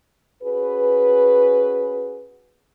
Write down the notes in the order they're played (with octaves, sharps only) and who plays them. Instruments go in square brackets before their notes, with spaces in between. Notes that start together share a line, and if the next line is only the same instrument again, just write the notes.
[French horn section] C#4 F#4 G#4 B4